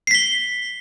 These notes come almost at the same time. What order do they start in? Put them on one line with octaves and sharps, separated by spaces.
C7 B6 G7